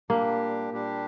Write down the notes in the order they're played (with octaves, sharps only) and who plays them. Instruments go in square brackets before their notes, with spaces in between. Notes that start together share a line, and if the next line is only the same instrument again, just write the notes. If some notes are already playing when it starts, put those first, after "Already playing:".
[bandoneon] A#2 G3 D4 G4 [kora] A#3
[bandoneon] A#2 G3 D4 G4